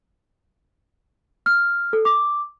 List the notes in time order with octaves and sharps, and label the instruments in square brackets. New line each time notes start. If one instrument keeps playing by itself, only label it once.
[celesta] F6
A4
D6